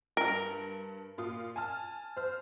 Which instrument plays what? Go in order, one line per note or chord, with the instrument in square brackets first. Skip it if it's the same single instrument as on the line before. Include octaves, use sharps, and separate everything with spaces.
[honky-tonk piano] G2 [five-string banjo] A#4
[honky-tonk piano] A#2 F4 D#6
G#5 A5 F6
C5 F6